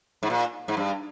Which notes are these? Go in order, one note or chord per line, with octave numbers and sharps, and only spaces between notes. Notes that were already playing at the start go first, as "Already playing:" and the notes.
G#2
A#2
G#2
G2